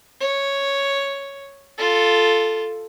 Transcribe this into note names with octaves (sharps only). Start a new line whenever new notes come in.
C#5
F4 A4